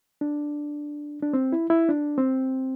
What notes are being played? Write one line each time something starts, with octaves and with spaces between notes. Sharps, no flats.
D4
D4
C4
E4
E4
D4
C4